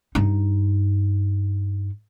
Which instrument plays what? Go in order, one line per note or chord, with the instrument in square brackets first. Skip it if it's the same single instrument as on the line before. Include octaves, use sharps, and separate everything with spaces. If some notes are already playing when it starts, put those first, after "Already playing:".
[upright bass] G2 D#4